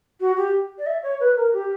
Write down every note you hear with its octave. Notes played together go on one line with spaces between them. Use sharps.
F#4
G4
D5
E5
C#5
B4
A#4
G4